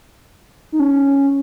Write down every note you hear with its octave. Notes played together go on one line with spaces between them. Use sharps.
D#4
C#4